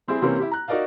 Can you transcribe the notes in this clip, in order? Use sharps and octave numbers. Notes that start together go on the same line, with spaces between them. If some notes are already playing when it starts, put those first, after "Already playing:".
G3 C4 E4 G#4
C3 E3 A#3 C4 C#4
E4 G4
A#5 F#6
D#4 F#4 A#4 D5 D#5 F5